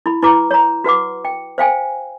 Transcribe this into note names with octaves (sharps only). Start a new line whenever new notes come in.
E4 B5
E4 B4 A#5 D6
C#5 A#5
F#4 B4 F#5 D6
G5
C5 F5 G5 G#5